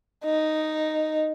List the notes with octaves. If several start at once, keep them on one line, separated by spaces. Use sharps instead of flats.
D#4